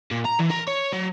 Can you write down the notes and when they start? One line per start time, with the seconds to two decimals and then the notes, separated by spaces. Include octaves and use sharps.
0.11 A#2
0.25 A#5
0.39 E3
0.50 A#4
0.67 C#5
0.93 F#3